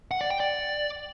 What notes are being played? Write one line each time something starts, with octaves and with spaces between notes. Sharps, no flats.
F#5
D5
G5
D5